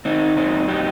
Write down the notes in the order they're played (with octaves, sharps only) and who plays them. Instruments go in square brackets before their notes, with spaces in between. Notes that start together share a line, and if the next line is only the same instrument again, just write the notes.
[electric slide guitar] D#3 C4 D#4
F#2 C4 D#4
F#3 D#4 G4